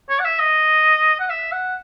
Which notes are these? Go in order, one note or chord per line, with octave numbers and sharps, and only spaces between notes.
C#5
F#5
E5
D#5
F#5
E5
F#5